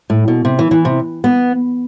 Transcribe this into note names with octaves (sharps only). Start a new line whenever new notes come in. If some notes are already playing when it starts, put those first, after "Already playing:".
A2
B2
C3
E3
E3
C3
B3